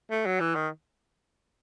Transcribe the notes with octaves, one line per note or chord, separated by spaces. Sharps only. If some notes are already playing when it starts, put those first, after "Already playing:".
A3
F#3
E3
D#3